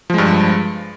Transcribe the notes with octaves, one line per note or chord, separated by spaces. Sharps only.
G2 F3 G#3